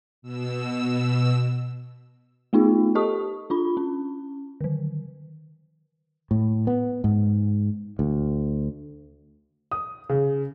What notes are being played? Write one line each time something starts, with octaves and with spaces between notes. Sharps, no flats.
B2 E6
A3 B3 D#4 F4 G#4
G4 A4 D#5 A5 C#6 D#6
D4 F4 B5
C#4
D3 D#3
A2
B3
G#2
D2
D#6
C#3